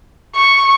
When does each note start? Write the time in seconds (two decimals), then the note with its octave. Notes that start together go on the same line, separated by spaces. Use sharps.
0.36 C#6